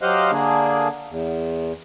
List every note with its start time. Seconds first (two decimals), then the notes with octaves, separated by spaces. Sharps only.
0.01 F#3 G4 C5 D#5 F5 F#5
0.32 D3 A#3 D4 G#4
1.10 E2